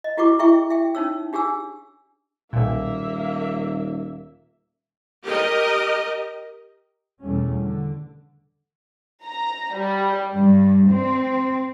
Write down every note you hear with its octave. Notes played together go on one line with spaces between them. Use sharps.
D#5
E4 F#4 G4 B4 C#6 D6
E4 G#4 E5 G5 C#6
E5 G5
C#4 D#4 C#5 E6
D4 G4 G#4 G#5 E6
D#1 B1 A#2 A#3 E5
G4 A#4 D#5
E2 B2 G3 A3 C#4
D3
A#5
G3
G2
C4